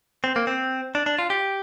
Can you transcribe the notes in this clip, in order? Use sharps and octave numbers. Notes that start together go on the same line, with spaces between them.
C4
A#3
C4
D4
D4
F4
G4